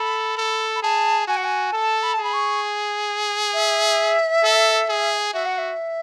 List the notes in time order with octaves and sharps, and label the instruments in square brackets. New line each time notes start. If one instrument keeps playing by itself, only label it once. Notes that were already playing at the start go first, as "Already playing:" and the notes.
Already playing: [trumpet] A4 [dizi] B5
[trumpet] A4
[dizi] B5
[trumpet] G#4 [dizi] A5
[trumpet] F#4 [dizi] G#5
[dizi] F#5
G#5
[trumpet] A4 [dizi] A5
[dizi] B5
A5
[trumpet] G#4
[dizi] B5
C#6
E5
[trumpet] A4
G#4
[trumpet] F#4 [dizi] E5
[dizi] F#5
E5